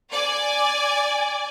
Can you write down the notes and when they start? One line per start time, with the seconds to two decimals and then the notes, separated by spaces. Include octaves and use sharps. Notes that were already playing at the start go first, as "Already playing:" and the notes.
0.12 D5 G#5